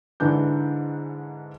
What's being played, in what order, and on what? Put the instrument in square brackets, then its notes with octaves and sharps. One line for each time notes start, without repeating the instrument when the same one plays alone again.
[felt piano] G#2 D3 E3 D4 G6